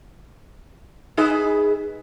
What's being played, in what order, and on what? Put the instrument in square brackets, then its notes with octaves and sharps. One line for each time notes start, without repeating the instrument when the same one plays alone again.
[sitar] D#4 G#4 B4